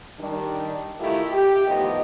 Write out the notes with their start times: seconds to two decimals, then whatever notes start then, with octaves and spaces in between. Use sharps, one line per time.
0.20 D#3 G3 D4
1.00 D#3 A3 E4 F4 G4 A4
1.32 G4
1.67 A2 D#3 F3 B3 D#5